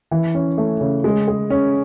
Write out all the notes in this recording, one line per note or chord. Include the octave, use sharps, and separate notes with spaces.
E3
C#4
A3
C#3
G#3
G#4
C#4